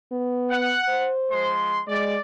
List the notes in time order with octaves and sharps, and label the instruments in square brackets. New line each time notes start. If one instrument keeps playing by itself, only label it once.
[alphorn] B3
[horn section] F#5
[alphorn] C5
[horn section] F3 G#3 C6
[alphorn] G#3 [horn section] D5